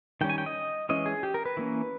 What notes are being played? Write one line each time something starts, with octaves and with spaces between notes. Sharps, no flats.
D#3 G3 C#4 G5
G#5
G5
D#5
E3 G#3 C#4 D#5
G#4
G4
A#4
B4
E3 A#3 C#4